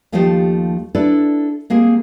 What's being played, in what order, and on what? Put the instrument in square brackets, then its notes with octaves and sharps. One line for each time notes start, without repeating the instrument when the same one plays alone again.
[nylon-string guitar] D#2 F3 A3 D#4 G4 C5
D4 E4 A4 B4 D5
G#3 A#3 C4 G#4